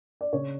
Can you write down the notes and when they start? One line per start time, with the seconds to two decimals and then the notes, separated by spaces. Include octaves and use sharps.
0.21 D5
0.33 C#3 C#5